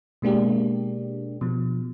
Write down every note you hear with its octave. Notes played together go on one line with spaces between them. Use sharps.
B2 G#3 A#3 D4 G4
B2 F3